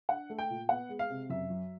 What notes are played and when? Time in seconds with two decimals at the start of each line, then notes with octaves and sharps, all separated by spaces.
0.09 D4 F#5
0.30 A3
0.39 G5
0.50 A#2
0.69 B3 F#5
0.89 G#3
0.99 F5
1.10 C3
1.30 F#2 E5
1.50 F#3